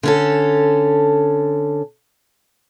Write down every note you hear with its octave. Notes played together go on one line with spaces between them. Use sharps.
D3 C#4 A4